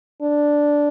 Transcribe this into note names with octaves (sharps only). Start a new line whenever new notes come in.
D4